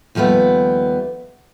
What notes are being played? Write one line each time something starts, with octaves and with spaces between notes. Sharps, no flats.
D#2 F3 G3 A3 B3